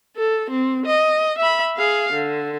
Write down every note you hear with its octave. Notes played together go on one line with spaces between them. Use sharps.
A4
C4
D#5
E5 B5
G#4 F5
D3